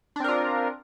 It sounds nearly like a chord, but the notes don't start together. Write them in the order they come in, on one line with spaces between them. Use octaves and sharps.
D4 C4 A#4 F4